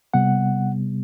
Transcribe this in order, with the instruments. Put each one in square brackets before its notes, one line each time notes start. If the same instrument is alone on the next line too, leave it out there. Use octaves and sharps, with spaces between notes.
[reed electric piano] C3 G3 B3 F#5